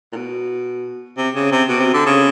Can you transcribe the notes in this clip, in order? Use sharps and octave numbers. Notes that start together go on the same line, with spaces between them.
A#2
B2
C3
C#3
C3
B2
C3
D3
C#3